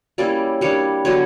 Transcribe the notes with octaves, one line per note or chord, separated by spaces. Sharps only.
G3 A#3 C#4 E4 D5
G3 A#3 D4 C#5
D3 F#3 B3 D4 C#5